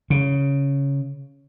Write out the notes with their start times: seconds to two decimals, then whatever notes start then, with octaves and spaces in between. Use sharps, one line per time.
0.10 C#3